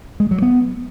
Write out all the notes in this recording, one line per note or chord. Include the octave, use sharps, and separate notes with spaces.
G#3
F#3
B3